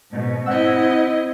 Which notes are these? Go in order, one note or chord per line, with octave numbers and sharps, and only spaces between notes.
G#2 B2
C4 E4 D#5 F#5 E6